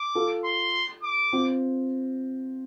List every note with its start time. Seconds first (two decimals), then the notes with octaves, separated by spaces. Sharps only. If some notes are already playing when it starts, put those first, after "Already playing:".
Already playing: D6
0.15 F4 A4
0.45 C6
1.03 D6
1.33 C4 F4